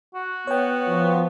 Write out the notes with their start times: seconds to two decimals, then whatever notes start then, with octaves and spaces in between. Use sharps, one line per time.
0.14 F#4
0.47 B3 C#5 G5
0.88 F3 F4